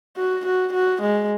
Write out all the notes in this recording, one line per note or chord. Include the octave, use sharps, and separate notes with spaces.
F#4
F#4
F#4
G#3